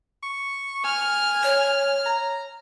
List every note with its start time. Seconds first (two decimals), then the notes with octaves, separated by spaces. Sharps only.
0.23 C#6
0.84 G#5 F6
1.43 C#5
2.06 A#5